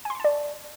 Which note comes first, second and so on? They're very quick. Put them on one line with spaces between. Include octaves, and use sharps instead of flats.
G#5 C6 C#6 A5 D5